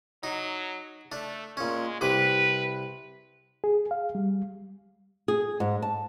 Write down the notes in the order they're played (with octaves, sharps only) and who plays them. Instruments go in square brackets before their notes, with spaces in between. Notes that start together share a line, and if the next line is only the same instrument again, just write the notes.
[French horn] F#3 [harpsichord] D#4
[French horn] A3 [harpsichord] D4
[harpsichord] A#2 C#4 [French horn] G#3
[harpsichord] C2 C3 D6 [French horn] B4
[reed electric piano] G#4
F5
G3
[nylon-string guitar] G#4
G#2
A5